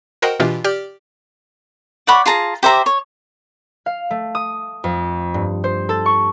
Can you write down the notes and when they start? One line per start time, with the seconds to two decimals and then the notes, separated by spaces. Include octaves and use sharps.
0.22 F#4 A#4 C5 D#5 F#5 G5
0.40 B2 E3 D4 F4 G4
0.64 G4 D5 F6
2.07 D5 F#5 B5 C#6
2.26 F4 G#4 A5 A#5
2.63 G4 C5 E5 A#5
2.86 C#5
3.86 F5
4.11 A3
4.35 D#6
4.84 F2
5.34 G2
5.64 C5
5.89 A4
6.06 C#6